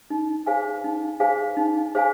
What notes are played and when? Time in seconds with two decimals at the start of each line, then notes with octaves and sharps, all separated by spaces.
0.10 D#4
0.46 G#4 C5 F5 G#5
0.84 D#4
1.20 G#4 C5 F5 G#5
1.57 D#4
1.95 G#4 C5 F5 G#5